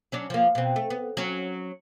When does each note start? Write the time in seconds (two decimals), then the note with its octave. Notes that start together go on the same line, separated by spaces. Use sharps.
0.12 F#3 C#4 D4
0.30 F3 A#3
0.55 B2 C4
0.76 A3
0.90 B3
1.17 F#3 C#4